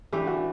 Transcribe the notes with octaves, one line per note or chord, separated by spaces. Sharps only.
E3 A3 D4 G4
F#4